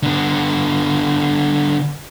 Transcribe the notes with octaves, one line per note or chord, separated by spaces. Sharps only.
D3 B3